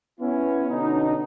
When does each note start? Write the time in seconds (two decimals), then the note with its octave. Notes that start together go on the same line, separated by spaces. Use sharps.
0.20 B3 C#4 E4
0.70 B2 D3 C#4 D#4